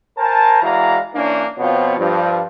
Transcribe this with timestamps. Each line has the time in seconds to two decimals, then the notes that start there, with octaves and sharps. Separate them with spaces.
0.18 A#4 C5 G#5 A5
0.61 E3 G#3 F#4 D5 F5 A#5
1.14 E3 A#3 C#4 D4
1.58 B2 F3 B3 C4 F4 C#5
1.97 G2 F3